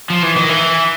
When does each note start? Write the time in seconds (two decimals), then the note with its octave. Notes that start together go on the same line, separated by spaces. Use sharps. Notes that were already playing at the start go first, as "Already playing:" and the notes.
0.10 F3
0.23 E3
0.36 D#3
0.49 E3